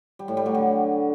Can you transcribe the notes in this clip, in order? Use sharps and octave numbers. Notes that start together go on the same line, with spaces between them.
G3
A2
G3
F#3
D3